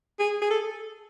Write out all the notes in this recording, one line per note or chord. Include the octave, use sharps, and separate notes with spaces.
G#4
G#4
A4